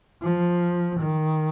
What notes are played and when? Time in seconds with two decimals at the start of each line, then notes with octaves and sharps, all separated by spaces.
0.22 F3
0.99 D#3